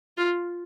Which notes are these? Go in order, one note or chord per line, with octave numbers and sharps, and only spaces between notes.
F4